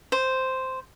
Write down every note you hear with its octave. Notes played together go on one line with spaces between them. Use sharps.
C5